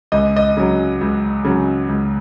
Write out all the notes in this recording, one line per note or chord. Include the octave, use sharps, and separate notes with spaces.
C#2 D#5
D#5
C#3 F#3
C#2
C#3 F#3
C#2